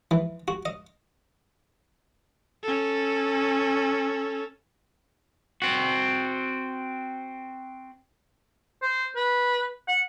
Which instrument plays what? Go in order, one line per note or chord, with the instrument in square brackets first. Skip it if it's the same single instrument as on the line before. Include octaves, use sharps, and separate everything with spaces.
[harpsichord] E3
F#4
D#5
[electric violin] C#4 A4
[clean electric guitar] C4 F#4
[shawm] C5
B4
F#5